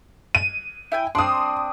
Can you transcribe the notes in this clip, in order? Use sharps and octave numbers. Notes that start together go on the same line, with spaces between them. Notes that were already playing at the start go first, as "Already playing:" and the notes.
D#7
E4 G5 G#5
C4 D4 C6 D#6